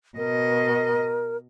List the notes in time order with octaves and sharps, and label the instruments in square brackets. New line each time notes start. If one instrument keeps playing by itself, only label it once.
[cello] B2 D#5 [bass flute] A#4